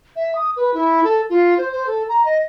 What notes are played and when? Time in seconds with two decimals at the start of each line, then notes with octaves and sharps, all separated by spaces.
0.16 E5
0.35 D#6
0.56 B4
0.74 E4
1.04 A4
1.30 F4
1.58 C5
1.72 C5
1.87 A4
2.09 A#5
2.25 D#5